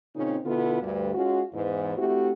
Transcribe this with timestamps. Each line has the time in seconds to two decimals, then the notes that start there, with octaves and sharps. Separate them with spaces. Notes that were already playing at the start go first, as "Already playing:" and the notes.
0.15 A#2 C#3 C4 C#4 D#4
0.45 B2 D3 B3 E4 F4 A4
0.81 D2 G2
1.14 G#3 C#4 F4 F#4
1.53 E2 G#2 E3
1.97 A3 C4 E4 F#4 G4